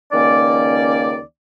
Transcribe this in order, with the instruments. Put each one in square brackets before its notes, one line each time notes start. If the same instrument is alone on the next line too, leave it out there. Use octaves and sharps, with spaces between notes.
[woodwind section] C#2 D#3 A#3 C#4 D5